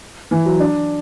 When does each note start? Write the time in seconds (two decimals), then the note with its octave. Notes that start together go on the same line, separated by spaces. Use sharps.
0.31 E3
0.46 F#3
0.60 D4